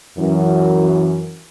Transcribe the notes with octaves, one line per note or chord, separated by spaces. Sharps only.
F#2 E3